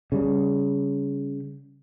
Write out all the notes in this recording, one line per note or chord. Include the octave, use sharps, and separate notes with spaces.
C#3 G3